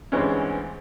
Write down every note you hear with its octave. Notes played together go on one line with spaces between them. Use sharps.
D2 G2 E3 G#3 C4 C#4